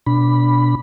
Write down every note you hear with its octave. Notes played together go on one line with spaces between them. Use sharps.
B2 D4 B5